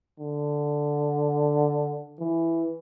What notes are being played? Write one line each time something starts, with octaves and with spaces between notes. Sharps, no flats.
D3
E3